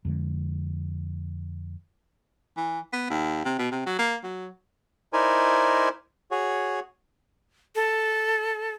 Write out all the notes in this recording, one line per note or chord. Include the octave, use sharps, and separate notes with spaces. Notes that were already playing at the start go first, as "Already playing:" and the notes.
F2 D3 G#3
E3
B3
D#2
C3
B2
C3
F#3
A#3
F#3
D#4 E4 A#4 C5 D5 G#5
F#4 G#4 C#5
A4